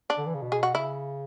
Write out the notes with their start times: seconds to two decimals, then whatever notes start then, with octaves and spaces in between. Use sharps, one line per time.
0.10 D4
0.18 D3
0.26 E3
0.34 C#3
0.42 B2
0.52 G#4
0.63 F#4
0.74 C#3 E4